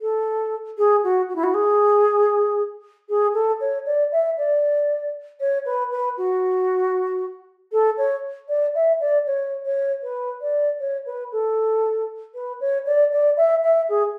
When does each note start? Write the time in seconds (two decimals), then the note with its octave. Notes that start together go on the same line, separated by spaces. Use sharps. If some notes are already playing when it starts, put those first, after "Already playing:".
0.01 A4
0.77 G#4
1.03 F#4
1.28 F#4
1.35 E4
1.43 F#4
1.54 G#4
3.09 G#4
3.34 A4
3.60 C#5
3.86 D5
4.12 E5
4.37 D5
5.40 C#5
5.65 B4
5.91 B4
6.17 F#4
7.72 A4
7.97 C#5
8.48 D5
8.74 E5
9.00 D5
9.26 C#5
9.65 C#5
10.02 B4
10.41 D5
10.79 C#5
11.06 B4
11.32 A4
12.34 B4
12.60 C#5
12.86 D5
13.12 D5
13.37 E5
13.63 E5
13.89 G#4